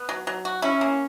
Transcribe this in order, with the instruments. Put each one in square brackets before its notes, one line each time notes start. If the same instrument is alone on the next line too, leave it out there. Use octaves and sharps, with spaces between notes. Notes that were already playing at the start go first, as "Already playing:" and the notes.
Already playing: [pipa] B3
F#3
F#3
F#4
[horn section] C#4 [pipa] E4
[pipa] A#3